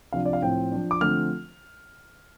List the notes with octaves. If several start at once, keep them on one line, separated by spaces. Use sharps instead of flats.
C3 F3 D4 F5
D5
F5
A2 F3 C4 G5
F3 D4
D6
D3 F3 A3 C4 F6